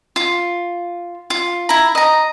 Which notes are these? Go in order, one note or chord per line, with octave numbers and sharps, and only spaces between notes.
F4
F4
E4 A#5
D#5 A#5